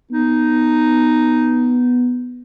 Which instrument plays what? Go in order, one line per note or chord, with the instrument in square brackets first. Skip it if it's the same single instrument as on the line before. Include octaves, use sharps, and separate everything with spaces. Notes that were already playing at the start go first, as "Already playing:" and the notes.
[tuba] B3 [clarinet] D#4